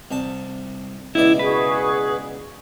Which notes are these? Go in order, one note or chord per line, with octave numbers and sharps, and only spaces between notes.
C2 A5
C#2 B2 E4 D5
F#4 G#4 B4